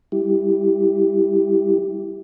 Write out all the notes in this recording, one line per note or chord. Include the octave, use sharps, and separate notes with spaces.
G3 E4 G4